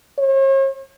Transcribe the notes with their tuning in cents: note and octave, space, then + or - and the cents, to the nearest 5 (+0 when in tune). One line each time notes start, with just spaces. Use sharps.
C#5 -45